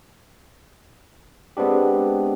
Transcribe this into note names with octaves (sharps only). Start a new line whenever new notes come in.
G#3 B3 C4 D4 G4